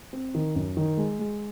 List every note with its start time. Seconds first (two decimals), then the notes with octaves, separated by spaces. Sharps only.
0.13 C4
0.35 D#3
0.56 F#2
0.77 D#3
0.97 G#3
1.19 G#3